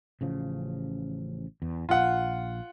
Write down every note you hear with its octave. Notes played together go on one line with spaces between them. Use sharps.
A1 C#3 F3
E2
A#1 F4 F#5